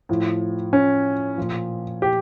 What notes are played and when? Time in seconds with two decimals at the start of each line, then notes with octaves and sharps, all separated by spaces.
0.09 A2 F3
0.73 C#4
1.37 A#2 F3
2.02 G4